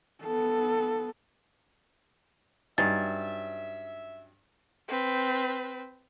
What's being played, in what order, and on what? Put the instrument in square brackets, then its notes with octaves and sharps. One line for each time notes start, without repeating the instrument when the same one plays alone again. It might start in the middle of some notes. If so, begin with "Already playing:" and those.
[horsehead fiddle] B3 A4
[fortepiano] G2 [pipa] F#3 C#4 D#4 [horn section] E5 [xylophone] A6
[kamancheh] C4 B4